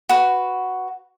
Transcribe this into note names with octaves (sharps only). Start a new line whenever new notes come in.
F#4 B4